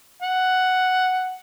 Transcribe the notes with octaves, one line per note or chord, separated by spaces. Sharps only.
F#5